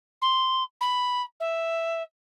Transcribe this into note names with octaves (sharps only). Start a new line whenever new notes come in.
C6
B5
E5